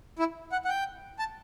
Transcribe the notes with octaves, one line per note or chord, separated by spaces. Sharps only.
E4
F#5
F#5
G5
A5